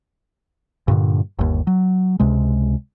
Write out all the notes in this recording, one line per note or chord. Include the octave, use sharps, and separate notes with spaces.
G2 A#2 D3
G1 D#2
F#3
C#2 C3 G#3